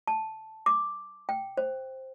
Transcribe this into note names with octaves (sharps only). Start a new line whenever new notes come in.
A5
D6
G5
C5